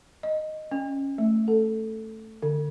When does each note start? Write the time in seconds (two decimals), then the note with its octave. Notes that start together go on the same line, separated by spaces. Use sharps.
0.23 D#5
0.71 C#4
1.18 A3
1.48 A4
2.43 D3